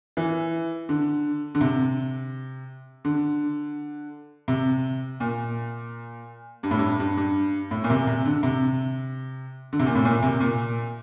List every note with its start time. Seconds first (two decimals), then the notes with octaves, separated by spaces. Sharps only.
0.17 E3
0.89 D3
1.55 D3
1.61 C3
3.05 D3
4.48 C3
5.20 A#2
6.63 G2
6.71 A2
6.79 G2
7.00 G2
7.17 G2
7.71 A2
7.84 A#2
7.90 C3
8.07 C3
8.25 D3
8.43 C3
9.73 D3
9.80 C3
9.86 A#2
9.95 A2
10.05 A#2
10.23 C3
10.40 A#2